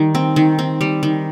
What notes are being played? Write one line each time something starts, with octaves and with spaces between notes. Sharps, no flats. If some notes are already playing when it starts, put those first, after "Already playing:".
Already playing: D#3 G3
C4
D#3
C4
G3
D#3